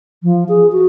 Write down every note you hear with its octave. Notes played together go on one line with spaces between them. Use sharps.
F3
G#4
F#4